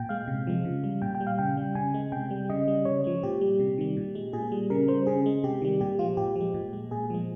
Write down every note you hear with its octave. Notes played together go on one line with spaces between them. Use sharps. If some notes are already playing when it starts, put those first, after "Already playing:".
Already playing: A#2 G5
G#3 F5
C3
F3 G#3
C#3
G3
A#2 G5
G5
G3
F5
C#3 G5
G3
C#3 G#5
G#3
C3 G5
G3
C#3 D#5
G3
C#3 C#5
F3 G#3
A#2 G4
G3
C3
D#3 G3
A#2
G#3
A#2 G#4
G3
C#3 A#4
G3 C5
C#3 G#4
G#3
C3 G4
D#3 G3
A#2 G4
F3 G#3 F4
A#2 G4
F3 G#3
A#2
G#3
A#2 G#4
F3 G#3